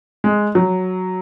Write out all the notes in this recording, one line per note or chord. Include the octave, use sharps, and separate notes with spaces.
G#3
F#3